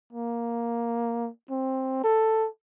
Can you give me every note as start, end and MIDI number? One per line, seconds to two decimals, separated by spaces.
0.13 1.30 58
1.50 2.01 60
2.04 2.48 69